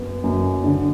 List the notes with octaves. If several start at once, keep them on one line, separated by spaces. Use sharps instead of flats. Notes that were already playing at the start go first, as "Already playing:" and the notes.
Already playing: F#2 B3
F#2
D3